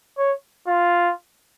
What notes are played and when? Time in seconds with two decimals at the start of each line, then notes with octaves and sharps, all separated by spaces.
0.18 C#5
0.68 F4